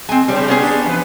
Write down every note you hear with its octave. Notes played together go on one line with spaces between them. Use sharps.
G#3 C4 G#5
G2 C#3 G3 C4
B3 C#4 G#4
D4 G4
E2 B4